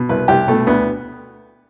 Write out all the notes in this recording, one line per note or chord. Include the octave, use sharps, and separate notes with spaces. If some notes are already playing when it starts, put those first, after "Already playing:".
Already playing: B2
C2 B4
C2 G4
B2 A3
D2 B3